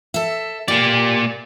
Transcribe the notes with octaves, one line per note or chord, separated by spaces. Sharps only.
A4 E5
A#3 G4 D5